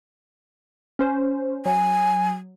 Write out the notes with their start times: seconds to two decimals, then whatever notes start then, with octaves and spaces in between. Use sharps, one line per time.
0.99 C#4 C5
1.66 F#3 G#5